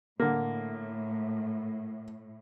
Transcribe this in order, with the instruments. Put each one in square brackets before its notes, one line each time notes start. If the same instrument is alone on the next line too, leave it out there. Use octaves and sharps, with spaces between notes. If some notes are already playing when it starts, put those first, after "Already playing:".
[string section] A2 [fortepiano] D3 A#3